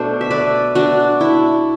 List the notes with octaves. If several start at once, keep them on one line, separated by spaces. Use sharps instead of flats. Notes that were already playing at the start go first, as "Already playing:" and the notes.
Already playing: B2 A3 D4 C5
E5
B4 D5
D4 F#4
E4